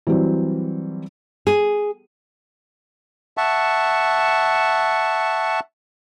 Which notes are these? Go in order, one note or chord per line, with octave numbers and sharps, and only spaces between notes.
E3 F#3 G3 C4 F#4
G#4
E5 F#5 A5 C#6